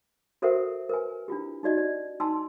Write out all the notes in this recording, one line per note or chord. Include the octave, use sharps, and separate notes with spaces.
F#4 A4 A#4 C5 E5 F#5
A#4 B4 G#5
D4 E4 F4 G4
D#4 F#4 D5 D#5
D5
D#4 G#5 A5 C6 E6